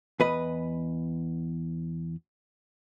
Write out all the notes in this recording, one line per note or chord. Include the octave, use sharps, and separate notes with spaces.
E2 B4 D#5